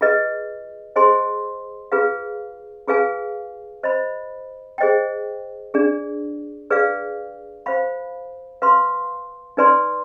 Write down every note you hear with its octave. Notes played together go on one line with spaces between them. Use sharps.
F4 G#4 B4 D#5
G#4 C5 D#5 G#5 C6
F4 G#4 B4 F5
F4 G#4 B4 F5 G#5
C5 D#5 B5
G#4 C5 D#5 G5
D4 G#4 D5
G#4 B4 D5 F5
C5 F5 B5
B4 F5 C6
D#4 B4 D5 G#5 C6